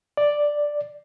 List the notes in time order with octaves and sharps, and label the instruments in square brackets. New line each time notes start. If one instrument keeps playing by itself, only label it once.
[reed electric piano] D5